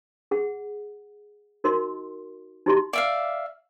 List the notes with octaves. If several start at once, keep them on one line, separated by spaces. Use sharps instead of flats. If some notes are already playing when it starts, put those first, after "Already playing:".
G#4 F#5
D#4 F#4 A#4 D#5 C6
D#4 E4 F#4 G4 D#5 C6
D5 E5 F5